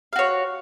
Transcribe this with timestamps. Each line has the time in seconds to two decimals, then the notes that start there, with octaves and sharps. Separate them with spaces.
0.13 F5
0.16 F#4
0.19 C#5